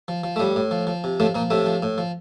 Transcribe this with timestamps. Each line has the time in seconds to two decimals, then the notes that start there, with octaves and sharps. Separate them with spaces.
0.08 F3
0.24 F3
0.36 A3
0.40 A2 G3
0.56 A2
0.71 F3
0.87 F3
1.04 C3
1.20 A2 F3 A3
1.35 A#2 F3 A#3
1.50 A2 C3 A3
1.66 F3
1.82 A2
1.98 F3